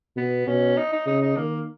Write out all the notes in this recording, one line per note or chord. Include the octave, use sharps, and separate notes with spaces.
B2 B3
B2 C#4
D#4
D#4
C#3 D#4
D#4
D#3 A#3